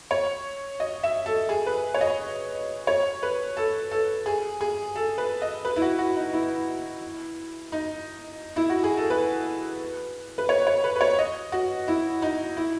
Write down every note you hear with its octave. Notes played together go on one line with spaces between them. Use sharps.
C#5
D#5
E5
A4
G#4
B4
C#5
D#5
C#5
B4
A4
A4
G#4
G#4
A4
B4
D#5
B4
E4
F#4
F#4
D#4
E4
D#4
E4
F#4
G#4
A4
B4
B4
C#5
C#5
B4
B4
C#5
D#5
F#4
E4
D#4
E4